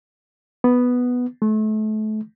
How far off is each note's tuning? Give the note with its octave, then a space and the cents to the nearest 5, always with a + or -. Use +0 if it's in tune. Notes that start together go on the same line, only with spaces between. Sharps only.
B3 +0
A3 -30